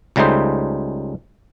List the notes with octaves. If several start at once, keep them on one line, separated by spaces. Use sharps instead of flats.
C#2 C#3 G3 A3 D#4 C5